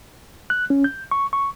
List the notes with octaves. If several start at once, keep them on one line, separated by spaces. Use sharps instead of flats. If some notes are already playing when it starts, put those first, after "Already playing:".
F#6
C#4
G6
C#6
C#6